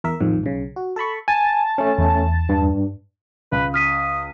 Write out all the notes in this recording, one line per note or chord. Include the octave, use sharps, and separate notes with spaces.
E2 A#4 E5
A1 F2 G#2 D#3 F3
B1 C#3
F#4
A4 A5 B5 C#6
G#5 A5
A3 C#4
E2
G2
C#2 B4
D#6 F6 B6 D#7